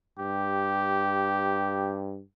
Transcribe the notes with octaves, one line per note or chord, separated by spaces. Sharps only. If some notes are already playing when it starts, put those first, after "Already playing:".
G2 G4